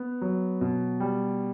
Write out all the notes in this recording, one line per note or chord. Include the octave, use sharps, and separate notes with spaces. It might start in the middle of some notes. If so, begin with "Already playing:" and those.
Already playing: B3
F#3
B2
G3